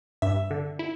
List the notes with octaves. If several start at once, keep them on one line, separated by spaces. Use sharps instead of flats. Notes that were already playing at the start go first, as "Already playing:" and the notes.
G2 E5
D3
E4